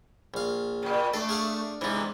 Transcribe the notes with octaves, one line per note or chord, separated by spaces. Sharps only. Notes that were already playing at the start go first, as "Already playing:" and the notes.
A#1 F5
A#2 C#3 G5
A3 D4 A4
G#4 F5 F#5
G#2 C3 E3 G#3 B3